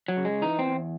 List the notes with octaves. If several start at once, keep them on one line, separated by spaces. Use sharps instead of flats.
F#3
C#3
G#3
E3 D#4
C4
E2